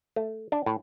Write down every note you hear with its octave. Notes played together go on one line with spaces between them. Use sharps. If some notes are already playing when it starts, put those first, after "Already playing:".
A3
D4
A2